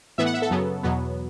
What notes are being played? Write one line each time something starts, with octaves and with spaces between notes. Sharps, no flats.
A2 E3 B3 E5
F#5
E5
A4
F#2 C#3 F#3 B3
E2 B2 F#3 B3